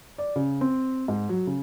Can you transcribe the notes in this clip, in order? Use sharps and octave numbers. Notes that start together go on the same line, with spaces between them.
D5
C#3
C4
G#2
F#3
C#3